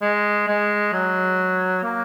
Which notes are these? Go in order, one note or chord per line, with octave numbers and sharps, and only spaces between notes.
G#3
G#3
F#3
A#3